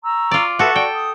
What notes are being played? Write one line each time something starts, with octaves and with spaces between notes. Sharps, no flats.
A#5 C#6 E6
F4 D5
F#4 A4 B4 E5
D5 G5
D#6